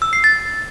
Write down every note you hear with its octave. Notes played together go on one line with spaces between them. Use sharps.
E6
C7
A6